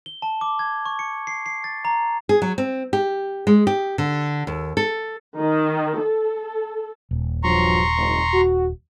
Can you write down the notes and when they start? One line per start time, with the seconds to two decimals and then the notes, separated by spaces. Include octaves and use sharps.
0.06 G7
0.22 A5
0.41 D6
0.59 G#6
0.86 C#6
0.99 C#7
1.27 C7
1.46 C7
1.64 A6
1.85 A#5
2.29 G#4
2.42 F#3
2.58 C4
2.93 G4
3.47 G#3
3.67 G4
3.98 D3
4.47 D#2
4.77 A4
5.38 D#3
6.01 A4
7.11 D#1
7.43 G2 F3 F#3 A#5 C6 C#6
7.97 F#1 G#2
8.34 F#4